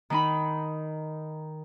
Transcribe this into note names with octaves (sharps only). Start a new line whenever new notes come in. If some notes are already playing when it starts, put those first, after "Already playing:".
D#3 D#4 B5